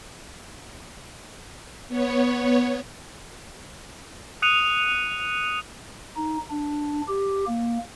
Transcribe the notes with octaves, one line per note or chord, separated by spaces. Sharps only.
B3 C#5
D#6 F#6 C#7 D#7 F7
D#4
D4
G4
A#3